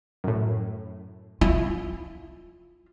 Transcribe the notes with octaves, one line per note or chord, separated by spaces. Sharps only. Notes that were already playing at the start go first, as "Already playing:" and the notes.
F#2 A2
E4 F4